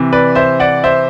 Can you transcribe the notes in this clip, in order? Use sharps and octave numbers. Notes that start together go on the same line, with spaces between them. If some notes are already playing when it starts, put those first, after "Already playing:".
Already playing: C3 E3
B4 D5
C5 E5
D5 F#5
C5 E5